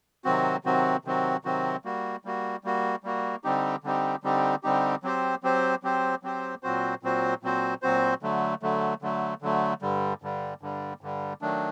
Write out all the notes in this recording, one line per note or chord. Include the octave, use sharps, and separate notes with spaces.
C3 D#3 F#3 C4 F#4
C3 D#3 F#3 C4 F#4
C3 D#3 F#3 C4 F#4
C3 D#3 F#3 C4 F#4
G3 A#3 F#4
G3 A#3 F#4
G3 A#3 F#4
G3 A#3 F#4
D3 G3 C4 D#4 G4
D3 G3 C4 D#4 G4
D3 G3 C4 D#4 G4
D3 G3 C4 D#4 G4
F#3 C4 G4 C5
F#3 C4 G4 C5
F#3 C4 G4 C5
F#3 C4 G4 C5
A#2 F#3 C4 F#4 C5
A#2 F#3 C4 F#4 C5
A#2 F#3 C4 F#4 C5
A#2 F#3 C4 F#4 C5
D3 F#3 A3
D3 F#3 A3
D3 F#3 A3
D3 F#3 A3
G2 D3 G3
G2 D3 G3
G2 D3 G3
G2 D3 G3
D#3 F#3 A3 D4